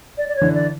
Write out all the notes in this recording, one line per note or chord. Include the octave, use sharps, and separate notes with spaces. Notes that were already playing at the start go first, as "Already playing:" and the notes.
D5
D5
C#5
D3 E3
D5